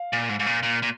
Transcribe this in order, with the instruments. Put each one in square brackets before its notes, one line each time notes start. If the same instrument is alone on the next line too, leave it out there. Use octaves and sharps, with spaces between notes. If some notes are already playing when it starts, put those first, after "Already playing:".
Already playing: [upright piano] F5
[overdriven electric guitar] A#2
G#2
G#2
A#2
A#2
A#2